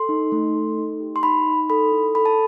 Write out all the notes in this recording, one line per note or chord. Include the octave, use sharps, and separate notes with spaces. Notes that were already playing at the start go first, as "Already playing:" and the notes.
Already playing: A4 C6
D#4
A3
A4
D#4
G4
C6
D#4 B5
D#4
A4 B5
E4
A4 B5
A5